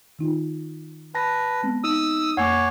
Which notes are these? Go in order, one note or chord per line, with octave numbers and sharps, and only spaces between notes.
D#3 D#4 F4
B4 A5 A#6
G#3 B3 C4
D#4 D#6 E6
F2 A#3 C#5 F#5 G#5 D6